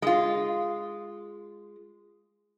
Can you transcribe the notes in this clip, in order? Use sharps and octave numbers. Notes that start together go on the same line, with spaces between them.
G#3 F4